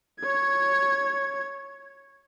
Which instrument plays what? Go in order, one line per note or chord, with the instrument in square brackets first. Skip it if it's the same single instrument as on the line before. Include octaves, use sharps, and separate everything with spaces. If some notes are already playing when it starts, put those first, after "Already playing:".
[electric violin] C#5 G#6